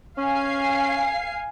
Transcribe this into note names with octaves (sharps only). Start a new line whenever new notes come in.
C#4 F5 G#5 C7